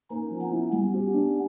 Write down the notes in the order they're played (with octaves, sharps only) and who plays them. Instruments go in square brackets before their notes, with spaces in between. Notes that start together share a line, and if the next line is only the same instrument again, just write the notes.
[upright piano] A#3 [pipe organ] C#4 D#4
[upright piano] F3
[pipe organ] B3 C#4
[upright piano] E4
[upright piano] G3 [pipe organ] B3 C#4
[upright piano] G4
D4